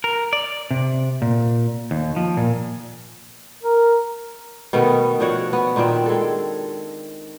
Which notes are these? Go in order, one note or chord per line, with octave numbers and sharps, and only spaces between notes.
A#4
D5
C3
A#2
D#2
F3
A#2
A#4
B2 D#3 A3 B3
F3 D4 F#4 C#5
B3
A#2 D#3 C4 D4
G#3 A4